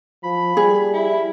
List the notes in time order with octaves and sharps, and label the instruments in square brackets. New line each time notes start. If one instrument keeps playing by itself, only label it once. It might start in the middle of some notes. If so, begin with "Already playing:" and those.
[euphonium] F3 [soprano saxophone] B5
[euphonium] G3 [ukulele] G#4
[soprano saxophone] E4